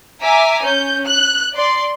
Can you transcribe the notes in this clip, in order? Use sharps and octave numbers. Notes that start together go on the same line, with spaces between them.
E5 G#5 A#5 D6
C#4 G6
F#6
D5 C6